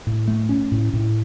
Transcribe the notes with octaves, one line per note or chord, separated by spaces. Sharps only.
A2
A3
C#4
A2
A2